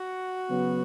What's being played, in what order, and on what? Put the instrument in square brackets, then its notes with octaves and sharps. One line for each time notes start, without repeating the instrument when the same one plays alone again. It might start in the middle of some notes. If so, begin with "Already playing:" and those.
Already playing: [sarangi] F#4
[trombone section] C#3 F#3 B3